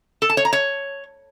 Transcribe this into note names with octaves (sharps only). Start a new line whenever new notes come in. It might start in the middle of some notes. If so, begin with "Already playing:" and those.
A4
A5
C#5
A#5
C#5